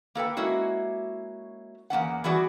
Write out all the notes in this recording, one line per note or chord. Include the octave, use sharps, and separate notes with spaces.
A#3 A4 B4 G5
G#3 A#3 C#4 E4 F#4
E2 A#3 C#4 F#5
E3 G3 B3 F#4 G#4 D5